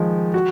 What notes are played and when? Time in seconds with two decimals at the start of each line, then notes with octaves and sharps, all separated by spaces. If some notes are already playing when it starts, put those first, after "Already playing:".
Already playing: D#3 F3 G#3
0.34 F#4